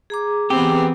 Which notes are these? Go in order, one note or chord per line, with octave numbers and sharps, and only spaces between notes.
G#4 A#5 D6
E3 B3 C4 G4